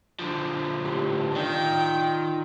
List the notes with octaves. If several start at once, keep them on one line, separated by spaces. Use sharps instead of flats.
D3 F3
A2 G4
D#3 F4 D5 G5